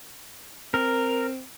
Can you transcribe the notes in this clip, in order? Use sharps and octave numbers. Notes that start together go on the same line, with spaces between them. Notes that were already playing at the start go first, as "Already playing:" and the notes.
C4 A#4